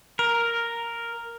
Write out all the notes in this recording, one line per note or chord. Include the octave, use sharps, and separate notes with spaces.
A#4